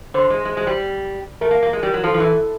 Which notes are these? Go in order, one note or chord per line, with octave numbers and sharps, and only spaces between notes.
D3 C5
G#3
G#3
G#3
G3
A3 A#4
A#3
A#3
G#3
G3
F#3
F3 A4
F3
E3